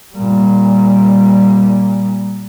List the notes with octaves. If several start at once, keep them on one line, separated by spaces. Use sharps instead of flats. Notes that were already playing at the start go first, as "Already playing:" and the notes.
A#2 G3